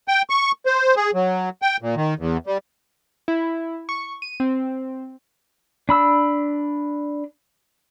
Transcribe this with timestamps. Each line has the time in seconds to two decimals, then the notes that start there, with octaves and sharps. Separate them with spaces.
0.08 G5
0.30 C#6
0.66 C5
0.96 G#4
1.14 F#3
1.62 G5
1.82 A#2
1.96 D#3
2.19 E2
2.47 G3
3.28 E4
3.89 C#6
4.22 D#7
4.40 C4
5.89 D4 B5 E6